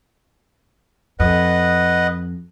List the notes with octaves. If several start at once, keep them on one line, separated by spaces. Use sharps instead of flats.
F2 B4 D#5 F#5